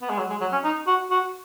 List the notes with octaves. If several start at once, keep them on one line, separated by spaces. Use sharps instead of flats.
B3
G#3
F#3
G#3
F#3
C#4
D#4
F#4
F#4